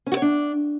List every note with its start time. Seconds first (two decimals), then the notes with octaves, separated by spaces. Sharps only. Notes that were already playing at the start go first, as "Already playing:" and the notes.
0.06 C#4
0.12 F#4
0.17 C#5
0.22 D4